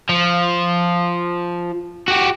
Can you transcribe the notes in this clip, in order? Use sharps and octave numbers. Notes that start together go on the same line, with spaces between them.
F3
F#4 G4